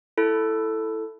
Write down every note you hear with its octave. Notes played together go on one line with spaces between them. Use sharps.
E4 A4